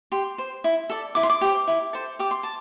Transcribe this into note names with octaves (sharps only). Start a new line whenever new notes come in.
G4 C6
C5
E4
A4 D5
E4 D6
C6
D6
G4 C5
E4
A4 C5
G4 D6
C6
A5